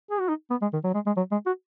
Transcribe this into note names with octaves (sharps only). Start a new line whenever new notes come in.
G#4
F#4
D#4
B3
G#3
D#3
F#3
G#3
G#3
F#3
G#3
F#4